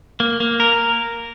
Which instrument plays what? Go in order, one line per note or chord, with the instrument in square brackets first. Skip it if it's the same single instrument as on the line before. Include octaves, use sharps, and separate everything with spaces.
[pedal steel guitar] A#3
A#3
A#4